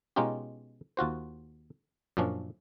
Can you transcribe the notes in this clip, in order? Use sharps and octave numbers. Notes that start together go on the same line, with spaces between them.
B2 G#3 C#4 D#4 F4 G4
D#2 F4 F#4 C5
F#2 A#2 F3 C#4 D4